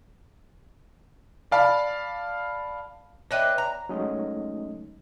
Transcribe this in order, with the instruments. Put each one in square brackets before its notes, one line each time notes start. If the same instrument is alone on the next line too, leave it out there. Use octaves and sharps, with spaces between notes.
[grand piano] D5 F5 A5 B5
[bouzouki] D4 B4 D#5 [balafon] C#5 E5 G5
[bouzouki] A#5
[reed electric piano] F#3 G#3 A3 C#4 D#4 D#5